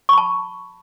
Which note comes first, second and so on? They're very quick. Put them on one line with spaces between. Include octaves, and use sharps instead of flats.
C#6 B5 A5